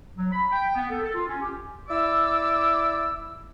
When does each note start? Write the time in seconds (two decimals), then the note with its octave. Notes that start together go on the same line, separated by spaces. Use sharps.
0.17 F#3
0.32 B5
0.51 G5
0.75 B3
0.90 A4
1.03 A4
1.15 F4
1.28 C#4
1.41 G4
1.88 E4 D5 D6 E6